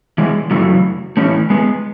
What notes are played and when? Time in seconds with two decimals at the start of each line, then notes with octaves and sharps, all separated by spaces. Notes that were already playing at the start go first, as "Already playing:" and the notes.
0.18 E3 G#3
0.51 F#2 C#3 E3 F#3 A3
1.17 A2 E3 A3 C#4
1.50 G#3 B3